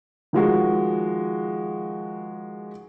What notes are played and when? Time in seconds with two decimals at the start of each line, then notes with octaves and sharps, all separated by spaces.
0.33 D#3 F3 G#3 F#4